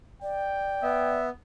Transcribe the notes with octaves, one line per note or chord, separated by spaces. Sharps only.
D5 G5
B3 E5